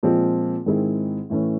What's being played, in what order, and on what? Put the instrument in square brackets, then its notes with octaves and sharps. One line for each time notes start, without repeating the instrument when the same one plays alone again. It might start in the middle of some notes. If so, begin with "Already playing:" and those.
[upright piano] A#2 F3 G#3 C4
G#2 D#3 G#3 C4 E4
A2 E3 A3 C#4